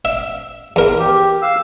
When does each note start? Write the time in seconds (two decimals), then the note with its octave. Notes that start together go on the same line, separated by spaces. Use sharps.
0.05 E5
0.76 E2 A#4
0.99 G4
1.42 F5 E6